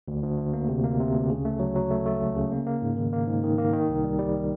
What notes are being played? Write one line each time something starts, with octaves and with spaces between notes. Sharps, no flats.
D2
D2
D2
A#3
C3
A#3
C3
D2
C#3
A3
F#3
F#3
A3
A3
C#2
C#3
A#3
A#3
G#2
D#3
A#3
G#2
D#3
A#3
D#3
C2
G3
G3